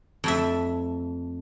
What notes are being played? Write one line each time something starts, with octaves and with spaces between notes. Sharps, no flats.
F2 A3 E5